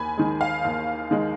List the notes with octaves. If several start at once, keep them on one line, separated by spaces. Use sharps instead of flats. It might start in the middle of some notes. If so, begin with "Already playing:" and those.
Already playing: D#2 G#5 B5
D#3 G#3
F5
D#2
D#3 G#3